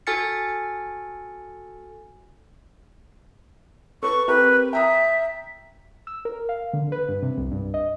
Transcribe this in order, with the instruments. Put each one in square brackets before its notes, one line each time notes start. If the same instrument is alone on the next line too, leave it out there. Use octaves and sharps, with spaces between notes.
[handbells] F#4 A4 G#5 F6 A6 C#7
[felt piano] A4 B4 [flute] C#6
[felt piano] C4 G4 A#4 [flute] B4
[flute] E5 [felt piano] G5 A#5 D#6
[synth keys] E6
A#4
F5
D3
B4
G2
C3
C2
G2
D#5